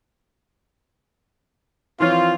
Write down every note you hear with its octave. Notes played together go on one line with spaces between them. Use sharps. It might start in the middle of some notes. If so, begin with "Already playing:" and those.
E3 F3 C4 F4 C#5